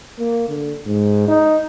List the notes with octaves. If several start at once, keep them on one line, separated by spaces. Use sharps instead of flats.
A#3
D3
G#2
D#4